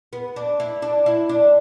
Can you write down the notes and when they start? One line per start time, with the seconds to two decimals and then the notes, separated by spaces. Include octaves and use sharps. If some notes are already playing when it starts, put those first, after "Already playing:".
0.13 B3
0.36 D4
0.60 E4
0.82 D4
1.06 E4
1.29 D4